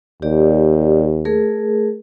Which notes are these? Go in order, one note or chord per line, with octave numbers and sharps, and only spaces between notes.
D#2 G4 D5
A3 G#4 A#4